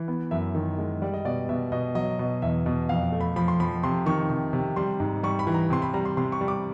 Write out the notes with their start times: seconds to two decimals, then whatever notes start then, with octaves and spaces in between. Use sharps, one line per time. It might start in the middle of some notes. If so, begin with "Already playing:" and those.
Already playing: E3
0.08 B3
0.31 F#2 E5
0.55 D#3
0.78 G#3
1.02 G3 D5
1.14 D#5
1.25 B2 D5
1.49 B2 E5
1.72 B2 D#5
1.95 F#3 D#5
2.19 B2
2.42 E2 E5
2.66 B2
2.89 F2 F5
3.12 A3
3.21 B5
3.36 F3 B5
3.48 C6
3.60 F3 B5
3.83 C3 C6
4.06 D#3 C#6
4.30 C3
4.53 C3
4.76 G3 C6
5.00 G#2
5.23 G3 C#6
5.39 B5
5.47 E3
5.54 A#5
5.70 C3 C6
5.82 B5
5.94 G3 A#5
6.05 C6
6.17 C3 C6
6.32 C#6
6.41 G3
6.48 D6